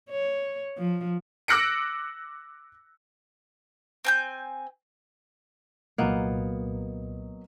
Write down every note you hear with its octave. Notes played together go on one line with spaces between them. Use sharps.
C#5
F3
D6 E6 F#6 A#6 C#7 D7
C4 G#5 G6
C2 A#2 F#3 A#3 B3 D#5